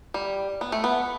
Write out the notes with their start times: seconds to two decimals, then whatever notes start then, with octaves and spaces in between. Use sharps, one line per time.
0.14 G3
0.61 B3
0.72 A3
0.84 B3